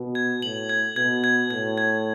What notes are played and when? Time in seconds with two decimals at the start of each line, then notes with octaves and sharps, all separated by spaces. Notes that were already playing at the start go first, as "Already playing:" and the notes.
Already playing: B2
0.15 G#6
0.42 A2 F#7
0.69 G#6
0.96 B2 G#6
1.24 G#6
1.50 A2 G#6
1.78 G#6